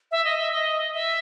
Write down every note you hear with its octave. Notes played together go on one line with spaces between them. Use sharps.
E5
D#5
E5
D#5
E5